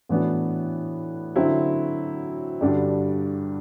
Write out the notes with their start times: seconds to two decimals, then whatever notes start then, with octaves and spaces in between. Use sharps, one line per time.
0.09 A2 E3 B3 D4 F#4
1.36 D3 F#3 C4 E4
2.61 G2 D3 G3 D4 F#4